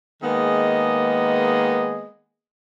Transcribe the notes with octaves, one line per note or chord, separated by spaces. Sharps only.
D#3 G#3 A#3 B3 G#4 D#5